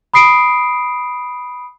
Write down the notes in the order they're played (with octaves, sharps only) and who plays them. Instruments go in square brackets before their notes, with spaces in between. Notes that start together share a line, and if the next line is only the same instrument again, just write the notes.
[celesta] B5 D#6 C7 D7